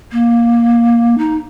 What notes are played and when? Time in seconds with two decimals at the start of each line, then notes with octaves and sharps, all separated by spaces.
0.12 A#3
1.18 D#4